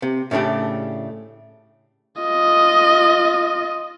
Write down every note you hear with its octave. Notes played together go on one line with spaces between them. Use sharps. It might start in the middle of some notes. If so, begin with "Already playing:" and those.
C3
A2 C#3 A3 D4 G4
F4 D#5